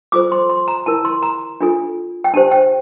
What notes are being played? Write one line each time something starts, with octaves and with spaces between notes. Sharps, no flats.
F4 A4 C5 D6
C6
C6
A#5
E4 A#4 A5
C6
A#5
D4 F4 A4
G5
D4 G4 C5 A5
G5